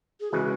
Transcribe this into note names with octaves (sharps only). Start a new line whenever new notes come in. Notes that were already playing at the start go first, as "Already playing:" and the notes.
G#4
C#3 E3 G#3 F#4